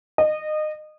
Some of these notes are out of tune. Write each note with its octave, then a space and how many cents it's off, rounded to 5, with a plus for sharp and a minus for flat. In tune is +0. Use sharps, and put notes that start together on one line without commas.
D#5 -25